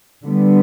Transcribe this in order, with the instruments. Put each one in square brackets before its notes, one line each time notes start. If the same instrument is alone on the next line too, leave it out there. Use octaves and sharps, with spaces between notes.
[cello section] D3 G3 B3